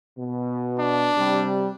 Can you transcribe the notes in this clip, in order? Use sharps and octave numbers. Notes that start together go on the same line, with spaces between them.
B2
D4
C3 G3